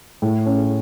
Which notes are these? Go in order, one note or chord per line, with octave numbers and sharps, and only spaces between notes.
A2
C#4